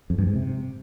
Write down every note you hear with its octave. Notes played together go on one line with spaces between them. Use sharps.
F2
G2
G#2
C3